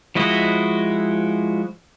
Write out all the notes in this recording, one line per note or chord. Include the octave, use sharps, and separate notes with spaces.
F3 G#3 E4 F#4 D#5